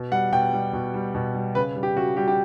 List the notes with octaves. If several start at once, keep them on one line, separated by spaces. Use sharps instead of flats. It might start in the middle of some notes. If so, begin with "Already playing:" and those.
Already playing: B2
G3 F#5
B2 G5
G3
B2
G3
B2
G3
C#3 B4
G3
G4
C#3 F#4
G3 G4
G4